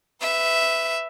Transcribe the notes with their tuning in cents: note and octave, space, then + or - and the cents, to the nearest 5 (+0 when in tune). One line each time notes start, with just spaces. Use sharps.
B4 +15 E5 +0